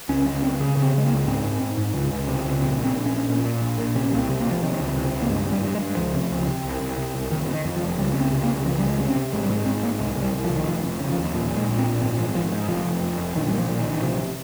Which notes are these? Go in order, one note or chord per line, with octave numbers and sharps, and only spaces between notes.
C#2 C#4
C#2 C#4
C#2 C4
C#3
C#3
C4
C#3 G#3
A#3
C#2
G#2 C4
G#2
G#2
G#2
C#2
C#2
C3
C#2
A#1 C4
A#1
C4
A#1
C#4
A#1
A#2
A#2
A#1
A#2
C3 C#4
C2 A#3
C4
C3
A#3
C3 F3
C3 D#3
C#2
C3
C#2
A#3
G2 G#3
G#1 G3
G2
G#3
G2
C#2 F3
C3
C#2
C3
C2
C2
C3
C2
F1 D#3
C3
D#3
F2
F3
F1
C#2 G3
C#2 C#4
C4
C3
A#3
C#2
C#2 F3
G3
C#2
G#3
C3 C#4
C4
C3
G#1 G#3
G3
G#2 G#3
G#2 C4
G#1 A#3
C2 G#3
C2 G3
C2
F3
C2
D#3
F1 F3
F1
C#3
F3
D#2
A#2 F3
A#2 G#3
A#1
C4
A#2
G#1 C4
G#1 F3
G#1 F3
G#2
F1 F3
F1
F2
F1
A#1 D#3
A#2 G3
F3
A#2
D#3
A#1
D#3
C3 F3